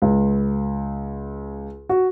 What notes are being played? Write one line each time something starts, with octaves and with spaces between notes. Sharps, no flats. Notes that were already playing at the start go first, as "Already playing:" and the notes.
C#2
F#4